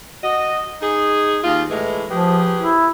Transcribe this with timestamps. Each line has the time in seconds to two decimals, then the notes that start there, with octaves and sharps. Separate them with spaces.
0.23 F#4 D#5
0.81 D#4 G#4
1.44 D#2 F4
1.68 A2 E3 G#3
2.09 F3 G4 G#4 B4
2.59 E4